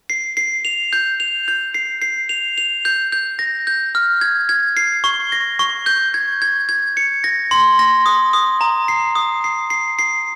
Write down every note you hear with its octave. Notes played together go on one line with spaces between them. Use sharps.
C7
C7
F7
G6
F7
G6
C7
C7
F7
F7
G6
G6
A#6
G6
F6
G#6
G#6
C7
C#6
A#6
C#6
G6
G#6
G#6
G#6
C#7
A#6
C6
A#6
D#6
D#6
A#5
C7
D#6
C7
C7
C7